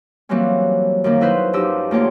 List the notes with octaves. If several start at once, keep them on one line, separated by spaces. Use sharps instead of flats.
E3 F#3 G3 A#3 C4 C#4
F#2 D#3 A#3
F#3 D#4 E4 B4 C5 G6
F#2 F3 D#4 G4 E6
D2 A#3 F4 C#5 G5